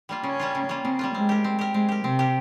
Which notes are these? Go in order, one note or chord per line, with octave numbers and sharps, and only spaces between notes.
G3 A#3 F4
C#3 C#4
G3 A#3 F4
C#3
G3 A#3 F4
C#3 C4
G3 A#3 F4
G#3 C4
G4 A#4
C4
G4 A#4
G#3 C4
G4 A#4
C3 C4
G4 A#4